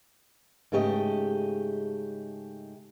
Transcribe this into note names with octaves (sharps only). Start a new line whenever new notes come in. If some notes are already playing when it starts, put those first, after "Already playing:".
G#2 C#3 A3 G4 D#5